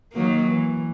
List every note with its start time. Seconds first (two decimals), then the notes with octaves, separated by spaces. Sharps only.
0.13 D#3 F#3 A#3
0.47 E3